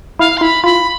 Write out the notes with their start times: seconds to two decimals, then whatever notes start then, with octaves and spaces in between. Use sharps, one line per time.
0.19 E4 F5
0.37 C6
0.41 E4 B5
0.64 F4 B5